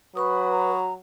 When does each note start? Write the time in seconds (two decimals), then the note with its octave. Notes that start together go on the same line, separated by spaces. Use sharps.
0.15 F#3 B4 B5 C#6 D#6
0.52 A#5